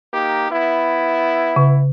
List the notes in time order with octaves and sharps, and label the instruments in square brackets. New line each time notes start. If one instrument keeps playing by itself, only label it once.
[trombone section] A#3 D#4 G4
B3 E4
[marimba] C#3